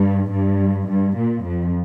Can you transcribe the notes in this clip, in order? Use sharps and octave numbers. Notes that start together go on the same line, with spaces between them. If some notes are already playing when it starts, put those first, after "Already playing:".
Already playing: G2
G2
G2
A#2
F2